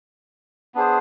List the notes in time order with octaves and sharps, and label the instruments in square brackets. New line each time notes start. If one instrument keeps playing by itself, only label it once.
[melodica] B3 D4 G#4 C5